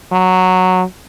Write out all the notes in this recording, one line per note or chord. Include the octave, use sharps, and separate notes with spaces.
F#3